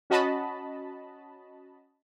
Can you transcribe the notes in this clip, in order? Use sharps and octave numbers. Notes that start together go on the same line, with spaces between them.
C#4 F#4 D#5 A5 B5